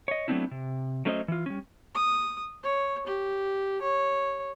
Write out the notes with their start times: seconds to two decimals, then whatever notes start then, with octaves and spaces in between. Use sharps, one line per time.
0.08 C#5 D#5
0.28 F#3 A3 B3 C4 D4 E4
0.51 C3
1.05 F#3 A3 C#4 C5 C#5 D#5
1.28 E3 F4
1.46 G3 C#4
1.95 D#6
2.63 C#5
3.06 G4
3.82 C#5